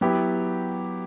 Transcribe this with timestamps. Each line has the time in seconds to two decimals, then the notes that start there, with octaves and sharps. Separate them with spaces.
0.01 F#3 B3 E4 G4